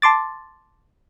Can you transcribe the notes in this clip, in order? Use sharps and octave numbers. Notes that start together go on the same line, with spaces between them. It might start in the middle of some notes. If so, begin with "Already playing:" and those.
A5 C6 D6 A6